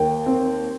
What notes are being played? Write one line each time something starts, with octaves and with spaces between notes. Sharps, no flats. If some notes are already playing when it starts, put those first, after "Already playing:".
Already playing: D#2 G5
C4